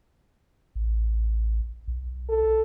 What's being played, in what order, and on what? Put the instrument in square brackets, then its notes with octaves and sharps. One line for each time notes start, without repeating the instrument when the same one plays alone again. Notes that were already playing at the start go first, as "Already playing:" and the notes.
[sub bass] A1
B1
[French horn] A4